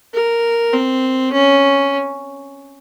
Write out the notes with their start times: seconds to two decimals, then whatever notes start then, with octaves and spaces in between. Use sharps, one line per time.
0.14 A#4
0.74 C4
1.32 C#4